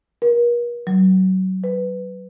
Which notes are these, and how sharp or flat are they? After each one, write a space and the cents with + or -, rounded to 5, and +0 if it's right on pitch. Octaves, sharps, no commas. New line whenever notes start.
A#4 +45
F#3 +25
B4 +10